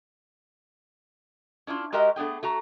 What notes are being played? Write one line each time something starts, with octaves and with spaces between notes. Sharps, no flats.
C#4 D4 E4 F4
G#3 F#4 G4 A#4 D#5 E5
A3 B3 D4 G#4 G5
A3 F#4 A#5